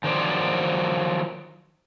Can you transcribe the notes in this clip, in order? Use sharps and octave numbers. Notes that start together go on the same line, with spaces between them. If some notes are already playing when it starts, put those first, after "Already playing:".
D#3 F3 F#3 C5 D5